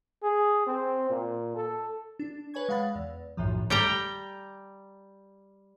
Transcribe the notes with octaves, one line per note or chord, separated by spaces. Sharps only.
G#4
C4
A#2
A4
D4
B4 C#5 G#5 C#6 G#6
G#3 F5 F#5 B5 A6
E2
B1 F#2 A2 D#3 F3
G3 G5 A#5